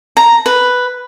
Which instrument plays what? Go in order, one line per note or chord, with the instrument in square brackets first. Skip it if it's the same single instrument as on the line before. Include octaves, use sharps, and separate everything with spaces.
[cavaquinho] A#5
B4